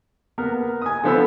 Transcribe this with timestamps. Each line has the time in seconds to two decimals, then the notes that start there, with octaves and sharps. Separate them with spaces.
0.38 A#3 B3 A#4
0.82 G#5 D#6
1.04 D3 F3 B3 C5 B5 E6